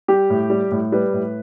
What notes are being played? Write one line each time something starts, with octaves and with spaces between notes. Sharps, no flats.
G3 G4
A2
G3
A2
G3 B4
A2